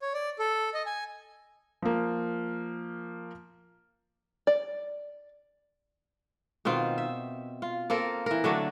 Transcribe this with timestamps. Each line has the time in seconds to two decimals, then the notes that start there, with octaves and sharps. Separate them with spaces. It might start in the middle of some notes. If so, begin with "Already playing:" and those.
0.02 C#5
0.14 D5
0.39 A4
0.74 D#5
0.86 G#5
1.82 F3 A#3
4.47 D5
6.65 B2 D#3 C4 F4
6.98 E5
7.62 F4
7.90 A#3 C4 A4 A#4
8.26 E3 A#4
8.44 D3 F#3 A3 D4